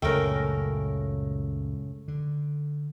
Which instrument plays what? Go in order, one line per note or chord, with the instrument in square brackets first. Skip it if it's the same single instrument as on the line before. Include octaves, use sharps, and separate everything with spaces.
[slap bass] C#2 F#2 A#2 [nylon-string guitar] C#3 G5 [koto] A3 A#4
[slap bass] D3